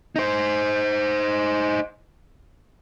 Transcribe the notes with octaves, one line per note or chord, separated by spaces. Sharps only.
D#4 C5